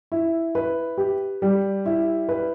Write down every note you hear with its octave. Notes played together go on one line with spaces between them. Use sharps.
E4
B4
G4
G3
E4
B4